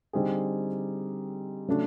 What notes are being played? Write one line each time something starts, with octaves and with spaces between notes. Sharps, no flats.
D3 G3 C4 D#4 G#4
C#3 F#3 A3 D4